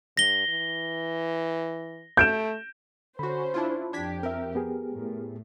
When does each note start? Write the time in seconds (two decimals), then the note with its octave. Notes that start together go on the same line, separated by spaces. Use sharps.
0.17 G2 A#6 G7
0.48 E3
2.17 A3 G6 D7 E7
3.19 D3 C#4 F#4 C5 B5
3.54 D4 E4 F4
3.93 F2 D4 G4 G#6 B6
4.23 C4 A#4 E5
4.55 B3 G4 G#4
4.91 A2